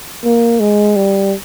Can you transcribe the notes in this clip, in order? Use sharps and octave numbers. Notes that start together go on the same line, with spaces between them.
A#3
G#3
G3